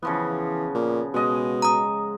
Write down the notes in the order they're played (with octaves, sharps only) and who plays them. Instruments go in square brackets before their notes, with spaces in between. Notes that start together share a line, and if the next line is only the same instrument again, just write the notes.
[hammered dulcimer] C#3 F3 B3 [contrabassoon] E3
[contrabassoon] A#2
[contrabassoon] B2 [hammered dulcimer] G#3 D#5
[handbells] A#5 D#6